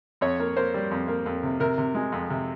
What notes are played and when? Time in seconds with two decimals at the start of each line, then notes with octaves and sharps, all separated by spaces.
0.21 F2 C#5
0.40 A#3
0.57 A#3 C5
0.74 G3
0.91 F2
1.08 A#3
1.26 F2
1.43 C3
1.60 C3 A#4
1.78 C3
1.95 G#3
2.12 F2
2.30 C3